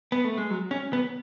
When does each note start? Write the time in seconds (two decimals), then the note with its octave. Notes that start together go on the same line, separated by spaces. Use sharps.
0.12 B3
0.24 A3
0.38 G#3
0.50 F#3
0.71 C#4
0.93 B3